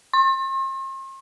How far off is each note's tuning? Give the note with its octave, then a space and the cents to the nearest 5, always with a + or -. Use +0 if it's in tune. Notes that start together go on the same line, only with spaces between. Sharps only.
C6 +45